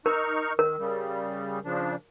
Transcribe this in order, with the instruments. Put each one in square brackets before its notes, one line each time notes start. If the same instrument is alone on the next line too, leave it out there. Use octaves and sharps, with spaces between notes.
[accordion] D#4 C#6 F6 [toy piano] A#4
[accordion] D#3 [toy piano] A#4
[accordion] C#3 G3
C#3 F3 D4